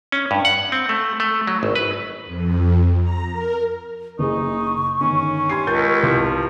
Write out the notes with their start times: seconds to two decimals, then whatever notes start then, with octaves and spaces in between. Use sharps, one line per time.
0.12 C#4
0.31 G2
0.45 F#5
0.72 C4
0.89 A3
1.20 A3
1.47 F#3
1.63 G#1
1.75 B4
2.26 F2
3.00 A#5
3.32 A#4
4.19 F#1 D#4 G#4 C#6
5.01 G1 D#3 C#4
5.49 G4 C6 G#6 C7
5.67 C#2 A#4 G6 A6
6.03 C2 F3